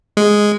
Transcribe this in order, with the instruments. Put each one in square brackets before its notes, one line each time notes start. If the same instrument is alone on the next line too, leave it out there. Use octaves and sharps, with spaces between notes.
[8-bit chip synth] G#3